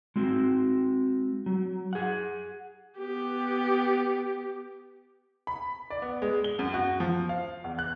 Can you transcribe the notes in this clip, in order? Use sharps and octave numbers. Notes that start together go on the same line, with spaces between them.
G#3 C4 F#4
F#3
G#4 F#5
B3 G4
B5
D5
B3
G#3
G7
F#2
F#4
F3
F5
E2
F#6